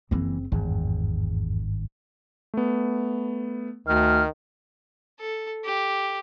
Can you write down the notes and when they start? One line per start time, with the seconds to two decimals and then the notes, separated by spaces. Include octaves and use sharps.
0.11 F#1 E3 A#3 C4
0.52 G#1 E2 G2
2.54 A3 B3
3.87 D2 D#3 F6
5.20 A4
5.65 G4